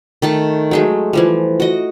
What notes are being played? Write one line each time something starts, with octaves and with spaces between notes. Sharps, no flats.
D#3 A3 A5
F#3 G#3 A3
E3 F3 G3
F#4 D#5